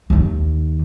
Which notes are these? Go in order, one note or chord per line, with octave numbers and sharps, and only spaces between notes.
D#2 D#3